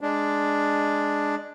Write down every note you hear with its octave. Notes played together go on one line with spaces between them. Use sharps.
G#3 D4